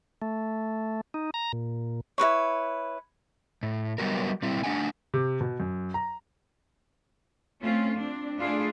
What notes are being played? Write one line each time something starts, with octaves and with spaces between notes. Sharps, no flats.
A3
D#4
A#5
A#2
E4 A#4 B4 C#5
A2
F#3 G3 B3 C#4 F#4 A#4
A#2 G3 C4 E4
A3 D4 E4 F#5 G#5
C3
B2
F#2
A#5
A3 C4 C#4 F4
C4 D4
A3 D4 E4 F4 G#4